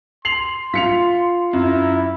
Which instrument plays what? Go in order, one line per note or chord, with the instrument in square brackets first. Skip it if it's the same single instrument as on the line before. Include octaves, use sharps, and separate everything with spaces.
[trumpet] C6 [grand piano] C7 F7 F#7
[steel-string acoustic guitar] F4 [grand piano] B6 C#7 F7
[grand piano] F#2 [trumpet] E4